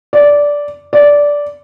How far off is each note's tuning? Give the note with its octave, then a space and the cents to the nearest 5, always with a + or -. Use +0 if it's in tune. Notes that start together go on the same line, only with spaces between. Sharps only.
D5 -10
D5 -10